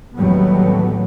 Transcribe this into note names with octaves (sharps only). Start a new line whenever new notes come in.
A1 D#2 F#3 G3 A3 B3